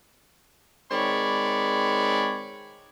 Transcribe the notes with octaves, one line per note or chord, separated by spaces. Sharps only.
D#3 G#3 C4 C#5 D5 B5